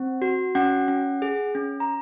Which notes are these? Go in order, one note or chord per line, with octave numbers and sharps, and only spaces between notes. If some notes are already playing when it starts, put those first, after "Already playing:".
Already playing: C4
F#4
C#4 F#5
C#4
G#4
C#4
A#5